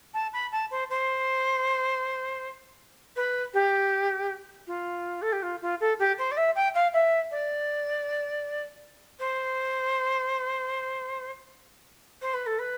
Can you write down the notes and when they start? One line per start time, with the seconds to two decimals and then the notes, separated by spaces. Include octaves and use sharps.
0.13 A5
0.33 B5
0.51 A5
0.70 C5
0.89 C5
3.16 B4
3.53 G4
4.67 F4
5.21 A4
5.32 G4
5.42 F4
5.61 F4
5.80 A4
5.99 G4
6.18 C5
6.31 D5
6.37 E5
6.55 G5
6.74 F5
6.93 E5
7.30 D5
9.19 C5
12.21 C5
12.33 B4
12.46 A4
12.58 B4